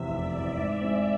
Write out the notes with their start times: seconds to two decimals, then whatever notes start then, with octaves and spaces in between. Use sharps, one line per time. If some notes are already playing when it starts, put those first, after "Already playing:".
Already playing: E2 C3 E5
0.08 F1 D5
0.34 E2 C3
0.57 G#2
0.81 G#3 C4